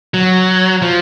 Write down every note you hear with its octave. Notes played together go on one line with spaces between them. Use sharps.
F#3
F3